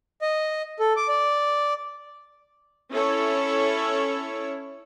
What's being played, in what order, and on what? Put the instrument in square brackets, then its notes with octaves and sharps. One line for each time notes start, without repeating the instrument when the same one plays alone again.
[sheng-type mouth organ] D#5
A4
D6
D5
[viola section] C#4 E4 A4 C#5